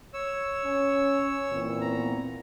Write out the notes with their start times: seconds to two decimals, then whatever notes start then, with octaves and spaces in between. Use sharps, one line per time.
0.14 C#5 E6
0.65 C#4
1.52 A#2 E3 C4
1.81 B3 A#5